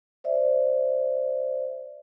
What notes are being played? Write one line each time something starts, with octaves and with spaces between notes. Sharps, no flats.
C5 D5 E5